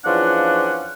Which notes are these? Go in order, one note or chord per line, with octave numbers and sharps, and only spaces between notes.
E2 F3 C#4 D4 F4 F#5